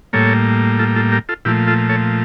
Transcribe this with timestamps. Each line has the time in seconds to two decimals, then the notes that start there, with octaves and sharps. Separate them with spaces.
0.13 A2 G3 A#3 A4 C#5
0.79 F4 A4
0.96 F4 A4
1.12 G4 A#4
1.29 F4 A4
1.45 A#2 F3 A3 E4 G4
1.67 F4 A4
1.89 A4 C#5